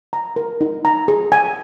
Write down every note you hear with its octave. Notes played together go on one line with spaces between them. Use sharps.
A#5
A#4
D#4
A#5
G#4
G#5